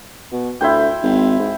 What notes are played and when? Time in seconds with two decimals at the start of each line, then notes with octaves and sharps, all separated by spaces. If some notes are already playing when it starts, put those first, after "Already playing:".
0.32 B2
0.61 D2 E4 C5 G5
1.03 G#1
1.39 G#2